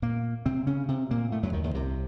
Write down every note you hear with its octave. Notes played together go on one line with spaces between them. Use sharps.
A#2 A#3
C3 C4
C#3 C#4
C3 C4
A#2 A#3
A2 A3
F#2 F#3
D#2 D#3
D#2 D#3
C2 C3